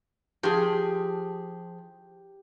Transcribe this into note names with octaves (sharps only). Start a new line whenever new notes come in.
F3 G4 G#4